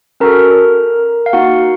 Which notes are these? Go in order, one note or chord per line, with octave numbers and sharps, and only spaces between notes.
C#4 F#4 A4 A#4 A#5
F5
A#3 D#4 F#4 F#5